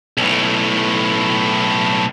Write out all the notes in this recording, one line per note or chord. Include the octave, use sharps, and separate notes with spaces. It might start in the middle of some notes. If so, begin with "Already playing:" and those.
B1 A2